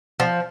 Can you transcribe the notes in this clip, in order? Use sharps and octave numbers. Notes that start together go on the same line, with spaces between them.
F3